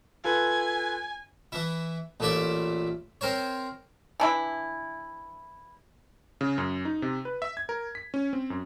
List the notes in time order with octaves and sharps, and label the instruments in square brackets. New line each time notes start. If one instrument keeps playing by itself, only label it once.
[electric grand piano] F4 A4 B4 [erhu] G#5
[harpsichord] E3 E4
A1 A#2 A3 E4 D5 E5
C4 A#4 C5 C#5
[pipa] E3 D4 E4
[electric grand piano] C#3
F#2
D#4
C3
B4
E5
G#6
A#4
B6
C#4
C4
F#2